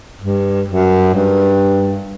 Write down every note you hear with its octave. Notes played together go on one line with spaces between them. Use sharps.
G2
F#2
G2